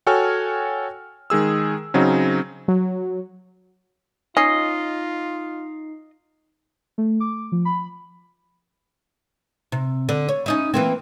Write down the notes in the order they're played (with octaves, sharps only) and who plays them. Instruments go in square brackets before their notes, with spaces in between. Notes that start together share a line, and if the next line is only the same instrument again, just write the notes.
[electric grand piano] F#4 A4 C#5 G5 G#5 F6
D#3 G#3 G#4 E6
C#3 F#3 C4 C#4 D#4
[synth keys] F#3
[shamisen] C#4 [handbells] D#4 C7 [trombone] F4 [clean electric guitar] D#5
[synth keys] A3
D6
F3
B5
[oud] C3
D3
C#5
C#4 D#4 E4
E3 A#3 C4